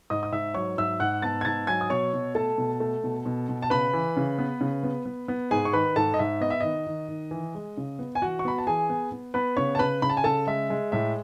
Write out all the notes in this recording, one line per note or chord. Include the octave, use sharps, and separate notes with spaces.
G#2 D#5 D#6
D#6
G#2 E5 E6
F#3 C#5 C#6
G#2 E5 E6
G#2 F#5 F#6
B3 A5 A6
G#6
G#2 A5 A6
F#3 G#5 G#6
D#6
B2 C#5 C#6
B2
A3 A4 A5
B2
A3
B2
B2
B2
A5
C#3 B4 B5
E3
C#3
B3
C#3
B3
B3
B3
G#2 G#4 G#5
C#6
D#3 B4 B5
G#2 A4 A5
D#5
G#2 E5
B3 D#5
E5
D#3 D#5
D#3
D#3
E3
G#3
C#3
B3
G#5
E3 F#4 F#5
C#6
B3 B5
A5
E3 G#4 G#5
B3
B3
B3 B4 B5
C#3 C#5 C#6
A5
C#3 B4 B5
C#3 B5
A5
G#5
C#3 A4 A5
G#3 E5
G#3
A2 E5